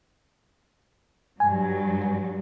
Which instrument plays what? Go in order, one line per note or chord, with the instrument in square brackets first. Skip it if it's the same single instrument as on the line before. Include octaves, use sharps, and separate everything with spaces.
[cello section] G2 F#3 [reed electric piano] G#5